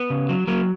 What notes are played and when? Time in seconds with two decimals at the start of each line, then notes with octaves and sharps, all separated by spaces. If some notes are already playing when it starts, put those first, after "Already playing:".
Already playing: B3
0.10 C#3
0.29 F#3
0.47 F#3 A#3